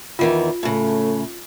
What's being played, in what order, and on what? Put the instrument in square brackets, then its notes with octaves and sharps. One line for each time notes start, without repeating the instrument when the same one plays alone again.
[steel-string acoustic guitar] E2 D#3 E3 [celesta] F4
[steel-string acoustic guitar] A2 C#3 [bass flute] A3